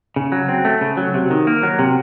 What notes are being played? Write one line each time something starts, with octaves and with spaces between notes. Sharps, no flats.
C#3
F#3
C4
A3
C#3
F#3
C3
D#3
A#3
F#3
C3